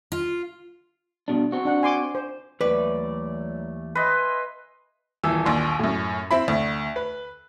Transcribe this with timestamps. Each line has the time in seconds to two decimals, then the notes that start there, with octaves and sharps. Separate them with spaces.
0.12 F4
1.28 G2 B2 D4
1.52 C4 F#4
1.65 D4 F#5
1.83 G#5 C6 D6
2.15 C5
2.61 D#2 E3 F#3 A3 B4 D5
3.95 B4 D#5 E5 G#5 C6
5.23 D#1 E3 E6
5.46 A#1 D#2 C6
5.79 F#2 A2
6.31 C4 E4 B5
6.48 D2
6.96 B4